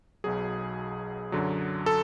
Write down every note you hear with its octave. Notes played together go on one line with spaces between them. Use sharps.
B1 B2 F#3 G#4
F#2 D3 F#3
A4